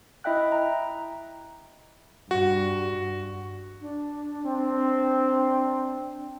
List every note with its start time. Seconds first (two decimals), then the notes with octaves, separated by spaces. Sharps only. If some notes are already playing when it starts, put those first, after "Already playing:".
0.24 E4 D#5 E5 G5 F#6
0.52 A#5
2.31 G2 F#4
3.80 D4
4.45 C4